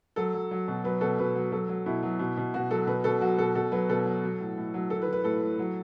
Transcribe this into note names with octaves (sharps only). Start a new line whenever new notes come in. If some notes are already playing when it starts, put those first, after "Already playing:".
F#3 A4
F#3
F#3
B2
F#3 B4
B2 A4
B2 B4
F#3
F#3 A4
F#3
B2 E4
F#3
B2
B2
B2 F#4
F#3 A4
B2 B4
B2 A4
F#3 F#4
B2 A4
B2 A4
F#3 B4
B2 A4
F#3
F#3
A2
A2
F#3
E3 A4
B4
E3
B4
A2 A4
A2
F#3